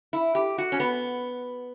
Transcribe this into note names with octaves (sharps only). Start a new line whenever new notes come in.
E4
G4
F#4
C#4
B3